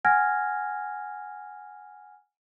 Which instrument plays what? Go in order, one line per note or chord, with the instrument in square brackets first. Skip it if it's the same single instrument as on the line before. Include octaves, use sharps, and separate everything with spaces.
[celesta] F#5 G#5 F6 G#6 A#6